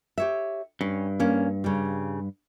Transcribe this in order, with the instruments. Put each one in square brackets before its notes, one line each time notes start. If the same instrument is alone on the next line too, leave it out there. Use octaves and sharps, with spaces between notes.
[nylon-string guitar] G4 C#5 E5
[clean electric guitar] G2 [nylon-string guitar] C#4
[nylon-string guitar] A#3 C#4
C#3 G3